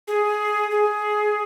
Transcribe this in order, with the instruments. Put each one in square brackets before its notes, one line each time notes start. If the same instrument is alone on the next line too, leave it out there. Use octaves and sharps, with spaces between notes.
[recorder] G#4
G#4